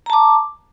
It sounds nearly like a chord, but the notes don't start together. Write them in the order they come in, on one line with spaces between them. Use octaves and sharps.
A#5 A5 D6